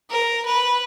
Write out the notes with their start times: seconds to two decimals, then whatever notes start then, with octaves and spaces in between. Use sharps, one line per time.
0.11 A#4
0.46 B4